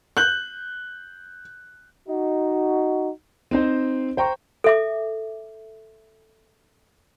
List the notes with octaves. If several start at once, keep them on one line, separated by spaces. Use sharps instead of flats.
F#6 G6 F#7
D#4 F#4
C4 D#4 C5
C5 G5 A#5 C#6
A4 E5 D6